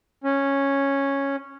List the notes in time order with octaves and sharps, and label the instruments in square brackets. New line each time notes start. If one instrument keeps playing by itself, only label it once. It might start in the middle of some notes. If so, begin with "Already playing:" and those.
[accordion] C#4